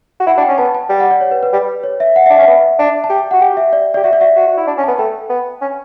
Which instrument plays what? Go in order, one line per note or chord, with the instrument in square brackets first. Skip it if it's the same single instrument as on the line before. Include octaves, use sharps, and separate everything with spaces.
[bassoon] F#4
[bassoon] E4 [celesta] F#5
[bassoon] D4
[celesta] G5
[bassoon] C#4
[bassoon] B3 [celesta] A5
[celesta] A5
[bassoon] G3 [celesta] G5
[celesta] F#5
D5
C#5
B4
B4
[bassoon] G3
[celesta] C#5
E5
F#5
E5
[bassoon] D4
[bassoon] C#4 [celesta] E5
[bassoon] B3
D4
[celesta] A5
[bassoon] G4 [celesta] G5
[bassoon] F#4 [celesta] F#5
[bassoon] G4 [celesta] G5
[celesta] E5
D5
[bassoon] G4 [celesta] D5
[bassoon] F#4 [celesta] E5
[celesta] D5
[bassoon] F#4 [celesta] E5
[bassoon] F#4
F#4
E4
D4
C#4
[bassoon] B3 [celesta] A5
[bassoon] A3 [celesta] G5
[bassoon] B3
C#4